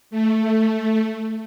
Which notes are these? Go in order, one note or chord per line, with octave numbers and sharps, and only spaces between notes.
A3